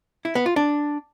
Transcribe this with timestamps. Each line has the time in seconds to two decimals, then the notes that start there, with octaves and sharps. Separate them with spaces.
0.25 E4
0.35 B3
0.46 F4
0.56 D4